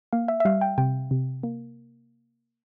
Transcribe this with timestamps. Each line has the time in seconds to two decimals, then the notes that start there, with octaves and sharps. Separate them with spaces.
0.13 A#3 F5
0.28 E5
0.40 E5
0.45 G3 F5
0.61 G5
0.78 C3 G5
1.11 C3
1.43 A#3